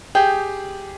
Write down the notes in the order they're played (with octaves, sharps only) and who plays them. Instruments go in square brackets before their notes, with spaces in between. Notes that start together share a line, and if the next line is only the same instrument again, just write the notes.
[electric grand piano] G4 G#4 [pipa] G5